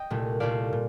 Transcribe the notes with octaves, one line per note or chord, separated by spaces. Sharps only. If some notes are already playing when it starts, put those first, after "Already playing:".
Already playing: D#5 G5
C2 A#2 A3
C2 A#2 A3 D5 F5
A#2